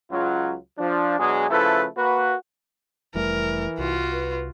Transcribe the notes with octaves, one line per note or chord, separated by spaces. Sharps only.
C#2 F#3 F4
F3 D4
B2 F#3 G#3 D4 G#4
C#3 F3 A3 E4 A4 B4
A#3 F#4 B4
F1 E3 G3 A3 A#4
C2 F4 F#4
B4